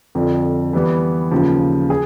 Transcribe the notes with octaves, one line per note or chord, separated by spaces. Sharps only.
F2 D3 F3
E3 G3 B3
D#2 C#3 F3
G#4